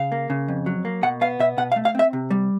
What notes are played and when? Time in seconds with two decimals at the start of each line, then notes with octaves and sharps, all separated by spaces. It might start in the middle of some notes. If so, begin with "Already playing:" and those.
Already playing: C#3 F5
0.12 A#3
0.30 C#3
0.48 F2
0.66 F#3
0.85 A#3
1.03 B2 F#5
1.21 B3 F5
1.39 B2 E5
1.58 B2 F#5
1.72 F5
1.76 A3
1.85 F5
1.95 C4 E5
2.13 C3
2.31 G3